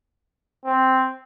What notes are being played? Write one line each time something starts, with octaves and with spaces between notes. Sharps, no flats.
C4